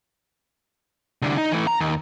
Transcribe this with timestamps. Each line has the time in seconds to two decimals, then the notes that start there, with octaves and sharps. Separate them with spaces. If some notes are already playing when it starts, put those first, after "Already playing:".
1.22 C2 D3
1.38 D#4
1.52 E3 A3
1.67 A#5
1.80 D#2